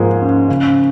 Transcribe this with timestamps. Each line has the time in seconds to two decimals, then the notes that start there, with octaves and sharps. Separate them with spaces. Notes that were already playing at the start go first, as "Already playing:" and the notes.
Already playing: G#2 F3 G#3 A#3
0.21 C#4
0.49 C#3